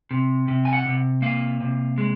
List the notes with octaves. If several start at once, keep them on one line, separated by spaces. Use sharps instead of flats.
C3
C3
G#5
F#5
C3
A#3 F5
C3
G#3